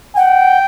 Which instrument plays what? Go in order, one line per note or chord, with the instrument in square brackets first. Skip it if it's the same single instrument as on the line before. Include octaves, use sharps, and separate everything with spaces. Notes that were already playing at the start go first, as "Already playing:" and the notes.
[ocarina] F#5 [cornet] G5